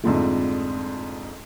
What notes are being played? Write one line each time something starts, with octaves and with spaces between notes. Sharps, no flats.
F2 G#2 D3 F3 A3